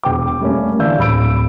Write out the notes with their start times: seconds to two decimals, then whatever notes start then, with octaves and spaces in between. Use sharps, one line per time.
0.03 E1 G5 D6
0.41 G3 A3 A#3 C#4
0.79 D3 E3 D4 F5 E6 G6
0.99 D1 B5 E6 D7